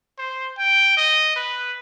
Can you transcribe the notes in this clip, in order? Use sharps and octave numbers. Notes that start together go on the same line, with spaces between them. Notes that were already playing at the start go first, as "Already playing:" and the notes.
C5
G5
D#5
B4